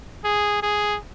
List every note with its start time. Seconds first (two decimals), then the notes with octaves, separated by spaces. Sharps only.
0.24 G#4
0.63 G#4